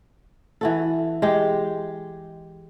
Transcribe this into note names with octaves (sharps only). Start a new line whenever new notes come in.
E3 F#4 A4
G#3 G4